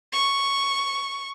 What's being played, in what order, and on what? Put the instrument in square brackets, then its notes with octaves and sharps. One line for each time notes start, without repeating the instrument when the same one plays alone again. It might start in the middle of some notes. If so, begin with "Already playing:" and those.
[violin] C#6